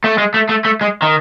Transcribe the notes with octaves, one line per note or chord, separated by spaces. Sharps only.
A3
G#3
A3
A3
A3
G#3
D#3